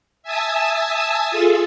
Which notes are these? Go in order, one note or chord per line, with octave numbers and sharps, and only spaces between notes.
E5 G#5 A5 D#6 E6
F4 G#4 A4